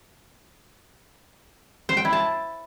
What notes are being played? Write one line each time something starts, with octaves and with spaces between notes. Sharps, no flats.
C5
G5
E4
A5